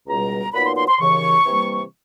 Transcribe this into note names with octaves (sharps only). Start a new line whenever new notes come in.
C#2 B2 G3 A#5
A#2 F#3 B3 D#4 B5
C6
C6
C6
D#2 C#3 E3 C#6
C3 E3 G3 A#3